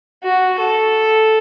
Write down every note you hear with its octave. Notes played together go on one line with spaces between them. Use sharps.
F#4
A4